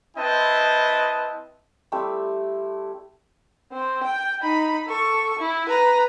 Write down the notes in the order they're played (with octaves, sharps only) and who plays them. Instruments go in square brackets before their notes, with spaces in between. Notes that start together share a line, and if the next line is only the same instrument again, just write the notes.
[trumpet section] C4 E4 B4 D#5 G5 A5
[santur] G3 A3 C4 E4
[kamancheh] C4
G5
D#4 B5
A4 C#6
E4
B4 A#5